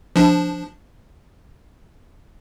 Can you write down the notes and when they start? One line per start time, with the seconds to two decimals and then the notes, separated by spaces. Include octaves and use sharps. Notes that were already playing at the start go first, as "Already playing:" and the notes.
0.16 F3 D4